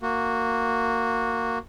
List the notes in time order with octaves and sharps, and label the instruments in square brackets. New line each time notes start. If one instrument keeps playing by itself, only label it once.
[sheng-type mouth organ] A#3 F#4